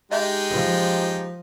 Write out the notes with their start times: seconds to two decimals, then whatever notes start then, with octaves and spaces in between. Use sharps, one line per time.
0.12 G#3 D#4 G4 D#5 E5 G6
0.51 F3